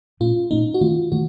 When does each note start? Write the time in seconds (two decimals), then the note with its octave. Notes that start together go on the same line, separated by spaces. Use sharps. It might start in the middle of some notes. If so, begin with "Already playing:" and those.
0.20 A#2 A3 C#4 F4
0.51 A#2 A3 C#4 D#4
0.74 F#4
0.81 D#3 A3 C4 F4
1.12 D#3 A3 F#4